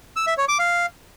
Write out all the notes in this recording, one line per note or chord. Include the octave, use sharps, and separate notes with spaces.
E6
E5
C#5
D6
F5